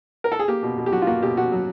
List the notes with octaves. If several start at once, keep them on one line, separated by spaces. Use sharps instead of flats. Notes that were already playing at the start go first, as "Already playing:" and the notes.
A#4
A4
G#4
A#3 G4
B2
B2
G4
F#3 F#4
F4
A#3 F#4
B2 G4
B2 F#4
F#3